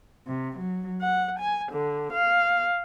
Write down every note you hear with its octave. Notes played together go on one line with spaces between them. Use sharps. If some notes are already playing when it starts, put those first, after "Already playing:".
C3
F#3
F#5
G#5
D3
F5